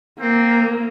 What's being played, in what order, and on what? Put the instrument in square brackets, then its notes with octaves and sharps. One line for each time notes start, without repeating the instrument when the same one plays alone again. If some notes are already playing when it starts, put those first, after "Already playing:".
[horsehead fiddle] A#3 [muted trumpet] C4